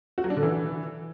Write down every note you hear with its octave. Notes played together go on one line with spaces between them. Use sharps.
F#4
F#3
D4
D3
E3